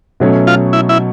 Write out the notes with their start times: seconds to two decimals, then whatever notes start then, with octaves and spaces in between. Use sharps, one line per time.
0.20 B2 F#3 A3 C#4
0.47 F4
0.73 E4
0.89 E4